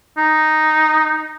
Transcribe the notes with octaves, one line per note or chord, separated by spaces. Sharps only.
D#4